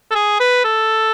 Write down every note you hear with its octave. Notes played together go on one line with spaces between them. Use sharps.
A4
G#4
B4
A4